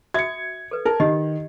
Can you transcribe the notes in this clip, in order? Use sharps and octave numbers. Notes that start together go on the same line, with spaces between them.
F#4 E5 D#6 G#6 C#7
A4 B4
A#4 A5
D#3 G4 D#5